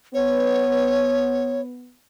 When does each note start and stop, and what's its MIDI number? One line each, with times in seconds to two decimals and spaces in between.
0.14 1.94 59
0.14 1.61 73